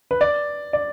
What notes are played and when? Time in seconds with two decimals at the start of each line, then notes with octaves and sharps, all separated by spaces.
0.11 B4
0.21 D5
0.73 D5